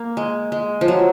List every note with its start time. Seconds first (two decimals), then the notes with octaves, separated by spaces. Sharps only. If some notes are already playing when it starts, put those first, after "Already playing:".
Already playing: A#3
0.17 G#3
0.52 G#3
0.81 F3
0.88 F#3